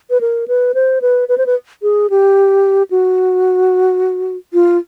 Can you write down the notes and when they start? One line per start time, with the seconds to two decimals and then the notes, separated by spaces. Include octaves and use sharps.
0.10 B4
0.21 A#4
0.48 B4
0.74 C5
1.02 B4
1.29 B4
1.38 C5
1.46 B4
1.82 G#4
2.10 G4
2.91 F#4
4.53 F4